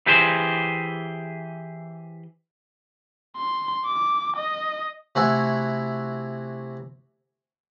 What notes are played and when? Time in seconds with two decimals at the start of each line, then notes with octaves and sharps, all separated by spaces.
0.06 E3 G4 G#4 C5
3.37 C6
3.86 D6
4.37 D#5
5.15 C3 A3 E4 F#4 G#5